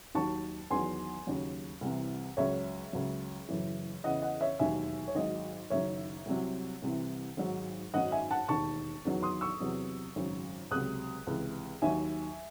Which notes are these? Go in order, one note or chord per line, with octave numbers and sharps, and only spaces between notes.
D#2 D#3 F#3 A5 C#6
E2 D#3 F#3 G#5 C6
D#2 C#3 F#3
C2 C3 E3
C#2 C#3 F#3 C#5 E5
C#2 C#3 F#3
F#1 F#2 E3
E2 C#3 E3 D#5 F#5
D#5 F#5
C#5 E5
E1 D#2 D#3 F#3 E5 G#5
C#5
G#1 G#2 F#3 D#5
F#1 F#2 D#3 C#5 E5
C2 C3 F#3
C2 C3 E3
G#1 G#2 F#3
G#1 F#2 D#3 F#3 D#5 F#5
E5 G#5
F#5 A5
E1 D#2 D#3 A5 C#6
E2 D#3 F#3
C6 D#6
C#6 E6
E2 C3 F#3
G#1 F#2 C#3
C#2 C3 F#3 D#6 F#6
C#2 C3 E3
D#2 D#3 F#3 E5 G#5